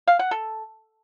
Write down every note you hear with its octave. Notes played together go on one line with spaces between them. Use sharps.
F5
F#5
A4